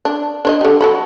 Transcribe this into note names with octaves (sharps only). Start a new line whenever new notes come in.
D4
D4 C5 D#5
D3 G3
F#3 A4 B5